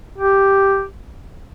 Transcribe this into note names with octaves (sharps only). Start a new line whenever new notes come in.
G4